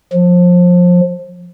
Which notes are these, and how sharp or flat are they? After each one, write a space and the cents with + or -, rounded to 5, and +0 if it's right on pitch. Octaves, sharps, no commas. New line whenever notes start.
F3 +25